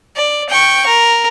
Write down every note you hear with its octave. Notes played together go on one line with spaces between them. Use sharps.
D5
G5 C#6
A#4